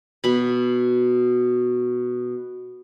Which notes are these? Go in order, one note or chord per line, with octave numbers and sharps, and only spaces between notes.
B2 B5